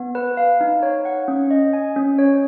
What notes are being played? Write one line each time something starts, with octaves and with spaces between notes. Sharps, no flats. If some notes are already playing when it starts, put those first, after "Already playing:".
Already playing: B3
B4
F5
D#4
C#5
F#5
C#4
D#5
G#5
C#4
C#5